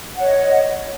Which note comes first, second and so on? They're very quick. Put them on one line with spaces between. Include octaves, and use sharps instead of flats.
F#5 C#5 D#5